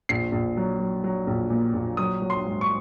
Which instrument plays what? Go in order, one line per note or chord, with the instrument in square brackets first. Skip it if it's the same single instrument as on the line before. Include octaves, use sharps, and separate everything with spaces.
[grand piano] A#1 C7
A#1
F#3
F#3
F#3
A#1
A#2
A#1
F#3 D#6
F#3
C6
G#2
C#6